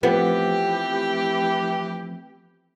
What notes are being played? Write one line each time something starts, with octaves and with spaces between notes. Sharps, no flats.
E3 F3 A3 B3 C4 G4